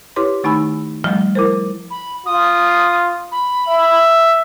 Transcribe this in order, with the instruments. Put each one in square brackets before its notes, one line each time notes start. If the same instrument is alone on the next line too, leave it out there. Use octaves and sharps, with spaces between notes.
[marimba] E4 G4 B4 C#5 C6
D#3 A3 D#4 G#5 B5 E6
F3 G3 A3
E4 A#4 C5
[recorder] B5
[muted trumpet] F4 [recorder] D#6
[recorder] B5
[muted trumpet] E5